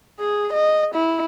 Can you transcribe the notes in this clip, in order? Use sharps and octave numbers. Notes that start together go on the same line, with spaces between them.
G#4
D#5
E4